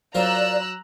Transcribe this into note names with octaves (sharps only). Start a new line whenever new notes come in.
F#3 F4 A#4 C5 D5 A#5 E6 F#6